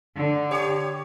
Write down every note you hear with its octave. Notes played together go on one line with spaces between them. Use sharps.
D3
G4 C#5